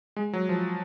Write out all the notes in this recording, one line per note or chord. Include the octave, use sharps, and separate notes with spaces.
G#3
F#3
F3